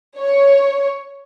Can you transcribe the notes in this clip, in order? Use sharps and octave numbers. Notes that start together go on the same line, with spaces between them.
C#5